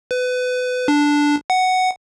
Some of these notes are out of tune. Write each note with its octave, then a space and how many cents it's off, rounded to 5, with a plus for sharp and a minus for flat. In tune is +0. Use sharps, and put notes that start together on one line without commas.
B4 +25
D4 -5
F#5 +5